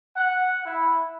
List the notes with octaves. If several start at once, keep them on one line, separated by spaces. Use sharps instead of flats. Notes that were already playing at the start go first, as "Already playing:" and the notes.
F#5
E4